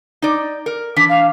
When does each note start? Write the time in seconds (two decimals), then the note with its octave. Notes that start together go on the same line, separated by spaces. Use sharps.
0.22 D#4 D5
0.66 A#4
0.96 E3 D4 B6
1.09 F5